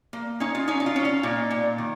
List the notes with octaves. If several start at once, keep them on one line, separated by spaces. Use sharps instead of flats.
A#3
C#4 D#4
F4
C#4 D#4
D#4
F4
C#4
F4
A#2 D#4
A#2
D#3